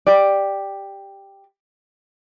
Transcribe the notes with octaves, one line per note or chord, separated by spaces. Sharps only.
G4 D5